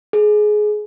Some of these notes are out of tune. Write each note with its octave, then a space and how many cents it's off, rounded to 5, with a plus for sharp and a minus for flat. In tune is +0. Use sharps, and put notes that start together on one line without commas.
G#4 +20